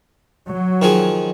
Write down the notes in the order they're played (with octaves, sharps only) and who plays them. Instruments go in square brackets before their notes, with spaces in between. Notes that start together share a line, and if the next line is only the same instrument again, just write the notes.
[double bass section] F#3
[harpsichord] D#3 F3 G#4